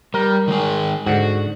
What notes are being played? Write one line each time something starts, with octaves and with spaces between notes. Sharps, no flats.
G3 A#4
D#3 G#3 G#4
G#2 D3 F#4